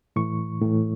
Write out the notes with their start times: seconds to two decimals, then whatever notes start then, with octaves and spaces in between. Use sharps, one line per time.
0.16 A2 E3 C#6
0.61 A2 E3